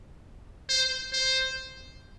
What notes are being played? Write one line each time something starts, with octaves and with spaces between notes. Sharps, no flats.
C5
C5